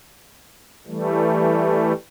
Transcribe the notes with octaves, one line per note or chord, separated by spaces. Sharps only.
E3 G3 A3